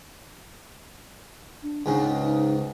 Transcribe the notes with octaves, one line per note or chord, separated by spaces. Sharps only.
D4
C#2 G#2 C#3 D#4
D#4